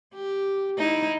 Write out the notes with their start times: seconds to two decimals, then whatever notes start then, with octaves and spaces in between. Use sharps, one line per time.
0.14 G4
0.78 D#4 E4